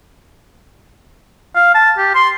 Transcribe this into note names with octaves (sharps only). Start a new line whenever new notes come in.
F5
A5
G4
C6